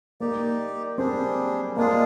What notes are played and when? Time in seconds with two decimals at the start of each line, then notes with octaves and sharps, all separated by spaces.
0.20 A#3 D#4 G4 D5
0.98 G3 C4 D4 G#4
1.76 G#3 A#3 D4 F4 G#4